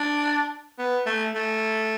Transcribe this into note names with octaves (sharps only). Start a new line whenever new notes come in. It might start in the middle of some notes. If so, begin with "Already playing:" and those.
Already playing: D4
B3
A3
A3